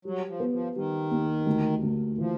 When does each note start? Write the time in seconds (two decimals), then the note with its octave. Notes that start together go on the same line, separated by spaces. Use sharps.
0.05 F#3 G3
0.28 F3
0.40 B3
0.52 F3
0.75 D#3 G3
1.11 D#2
1.46 D2
1.83 D2
2.18 E3 F3